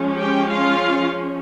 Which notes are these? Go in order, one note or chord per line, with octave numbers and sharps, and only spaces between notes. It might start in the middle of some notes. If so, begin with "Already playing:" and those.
Already playing: F3 G#3 C#4
G4 G5
F4 F5